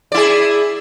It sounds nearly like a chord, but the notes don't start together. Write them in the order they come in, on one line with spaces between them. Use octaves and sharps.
D5 E4 G#4